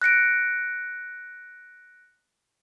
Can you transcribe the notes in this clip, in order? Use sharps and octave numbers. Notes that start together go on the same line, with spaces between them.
F#6 A#6 C#7 D7